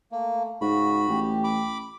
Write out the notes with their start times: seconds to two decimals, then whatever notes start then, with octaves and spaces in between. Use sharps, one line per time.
0.12 A3 A#3
0.61 G#2 C#3 F#4 B5
1.09 A1 G4
1.44 B5 D6